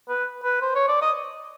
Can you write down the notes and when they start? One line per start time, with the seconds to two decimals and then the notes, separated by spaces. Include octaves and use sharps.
0.09 B4
0.44 B4
0.62 C5
0.76 C#5
0.88 D5
1.02 D#5